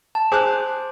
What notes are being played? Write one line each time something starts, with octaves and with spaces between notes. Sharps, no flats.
A5
G#4 C5 D6 F#6